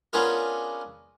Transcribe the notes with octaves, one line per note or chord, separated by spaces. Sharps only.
B3 C#4 D4 F4 G#4 A#4